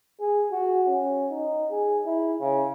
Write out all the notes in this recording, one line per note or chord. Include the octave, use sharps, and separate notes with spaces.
G#4
F#4
C#4
D#4
G#4
E4
C#3